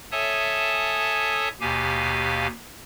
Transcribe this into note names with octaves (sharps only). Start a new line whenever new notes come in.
A4 C#5 E5 G#5 A5 D#6
D#2 B2 G4 F5 G#5